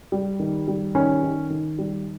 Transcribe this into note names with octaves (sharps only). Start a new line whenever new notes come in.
G3
D#3
G3
D#3 C#4
D#3
D#3
G3